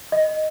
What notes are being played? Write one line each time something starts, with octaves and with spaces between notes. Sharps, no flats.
D#5